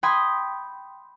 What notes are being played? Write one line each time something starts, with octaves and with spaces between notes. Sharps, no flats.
G5 B5 C6 D#6 G6 G#6